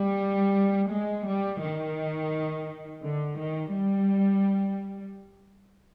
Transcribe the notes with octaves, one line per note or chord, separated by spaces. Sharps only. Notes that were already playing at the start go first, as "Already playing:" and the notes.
Already playing: G3
G#3
G3
D#3
D3
D#3
G3